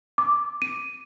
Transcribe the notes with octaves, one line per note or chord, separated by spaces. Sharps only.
D6
D#7